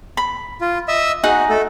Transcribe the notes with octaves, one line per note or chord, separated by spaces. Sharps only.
B5
F4
D#5 E5 E6
D#4 F#4 G#4 F#5
A3 A4